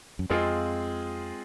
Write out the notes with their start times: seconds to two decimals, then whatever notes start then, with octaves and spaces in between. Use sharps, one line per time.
0.19 F#2
0.30 F2 G#3 C4 F4 G#4